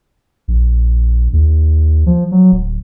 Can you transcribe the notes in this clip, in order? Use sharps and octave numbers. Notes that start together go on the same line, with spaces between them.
A#1
D#2
F3
F#3
D1